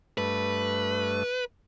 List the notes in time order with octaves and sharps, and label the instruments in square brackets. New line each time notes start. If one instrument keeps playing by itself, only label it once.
[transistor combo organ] G2 A3 [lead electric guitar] B4